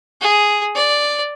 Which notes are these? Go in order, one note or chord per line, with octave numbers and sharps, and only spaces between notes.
G#4
D5